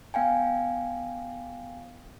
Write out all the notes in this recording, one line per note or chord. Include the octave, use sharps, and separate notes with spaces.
B3 F5 G5 G#5